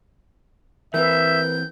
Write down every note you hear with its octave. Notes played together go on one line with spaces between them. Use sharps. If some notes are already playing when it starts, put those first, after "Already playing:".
E3 C4 A#4 B4 E5 G6